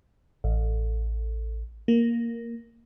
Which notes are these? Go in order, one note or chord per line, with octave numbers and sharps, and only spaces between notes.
A1
A#3